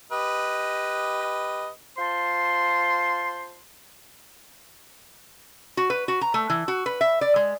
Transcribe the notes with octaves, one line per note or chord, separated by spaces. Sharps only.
G4 B4 D#5
F4 C5 A5 C6
F#4
B4
F#4
A#5
A3
E3
F#4
B4
E5
D5
G#3